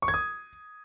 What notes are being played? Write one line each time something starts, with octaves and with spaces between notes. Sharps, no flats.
C#6
G#6
D#6